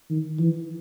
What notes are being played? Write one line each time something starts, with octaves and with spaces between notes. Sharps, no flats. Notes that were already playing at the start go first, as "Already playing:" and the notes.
D#3
E3